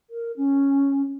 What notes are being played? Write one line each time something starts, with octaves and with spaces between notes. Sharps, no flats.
A#4
C#4